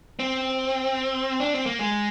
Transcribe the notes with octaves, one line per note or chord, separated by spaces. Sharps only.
C4
D4
C4
A#3
G#3